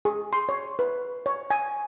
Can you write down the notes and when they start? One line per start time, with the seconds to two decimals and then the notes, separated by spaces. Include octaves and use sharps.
0.05 G#4
0.33 C6
0.49 C#5
0.79 B4
1.26 C#5
1.51 G#5